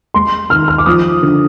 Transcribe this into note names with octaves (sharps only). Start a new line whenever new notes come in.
G#3 C6
D#3 F6
F6
D6
F3 D#6
D3